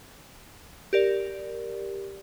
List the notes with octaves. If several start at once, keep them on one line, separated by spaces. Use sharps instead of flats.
G4 A#4 D5